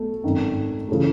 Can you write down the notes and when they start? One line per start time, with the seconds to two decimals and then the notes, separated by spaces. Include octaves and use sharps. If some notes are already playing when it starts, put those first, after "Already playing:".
Already playing: B1 B2 A3
0.24 G#1 F#2 D#3
0.89 C#3 E3 A3